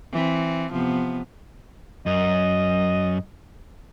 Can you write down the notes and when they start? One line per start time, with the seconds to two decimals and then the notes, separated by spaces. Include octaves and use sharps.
0.12 E3 C4
0.71 C3 F3 B3
2.06 F#2 D#5